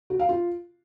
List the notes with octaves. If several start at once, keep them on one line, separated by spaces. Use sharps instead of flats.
F#4
F5
F4